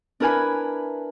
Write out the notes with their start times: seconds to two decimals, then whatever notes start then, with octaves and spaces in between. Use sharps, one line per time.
0.20 D4 E4 A#4 B4 G#5 B5